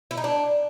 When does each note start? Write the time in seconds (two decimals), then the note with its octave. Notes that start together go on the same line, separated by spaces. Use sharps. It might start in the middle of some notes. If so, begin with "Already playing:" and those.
0.11 E4
0.17 D#4
0.24 D4